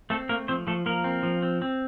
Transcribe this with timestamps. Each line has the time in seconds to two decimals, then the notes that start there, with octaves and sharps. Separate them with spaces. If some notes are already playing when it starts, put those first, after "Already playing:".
0.10 A3 C4 A4
0.29 A3 A#3 A#4
0.48 F3 C4 C5
0.67 F3 A3 A4
0.86 F3 A#3 A#4
1.04 C4
1.23 F3
1.42 C4
1.62 C4